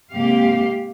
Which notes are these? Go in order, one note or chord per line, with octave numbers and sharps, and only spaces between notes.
G#2 C3 A#3 G4 F5